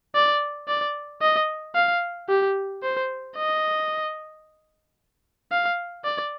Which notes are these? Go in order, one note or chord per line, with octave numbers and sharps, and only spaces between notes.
D5
D5
D#5
F5
G4
C5
D#5
F5
D5